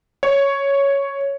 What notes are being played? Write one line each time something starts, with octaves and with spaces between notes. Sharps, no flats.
C#5